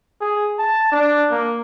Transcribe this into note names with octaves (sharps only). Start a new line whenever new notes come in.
G#4
A5
D4
A#3